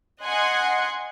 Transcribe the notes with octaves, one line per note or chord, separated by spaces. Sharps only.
D#5 F#5 G#5 C6 F#6 G#6